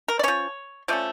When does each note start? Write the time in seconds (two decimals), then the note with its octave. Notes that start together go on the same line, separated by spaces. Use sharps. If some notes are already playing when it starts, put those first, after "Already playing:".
0.08 A#4
0.19 D5
0.23 F3 C#4 C#5
0.88 F3 A3 C#4 D5